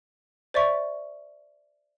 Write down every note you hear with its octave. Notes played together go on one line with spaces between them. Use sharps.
C5 D5 E5 C#6 B6